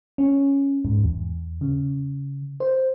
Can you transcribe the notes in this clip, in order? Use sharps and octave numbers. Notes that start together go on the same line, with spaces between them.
C#4
G#2
E2
C#3
C5